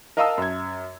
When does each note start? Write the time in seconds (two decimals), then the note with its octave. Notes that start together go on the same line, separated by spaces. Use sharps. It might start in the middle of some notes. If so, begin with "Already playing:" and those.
0.17 A#4 D#5 F5 A5 D#6 E6
0.38 F#2 G#6